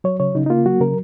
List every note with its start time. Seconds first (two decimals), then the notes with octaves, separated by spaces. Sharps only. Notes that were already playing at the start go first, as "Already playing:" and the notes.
0.04 F#3 C#5
0.20 C#3 C#5
0.35 C#3 D#4
0.46 D#4
0.50 A#3 F4
0.66 F#3 F#4
0.81 C#3 A#4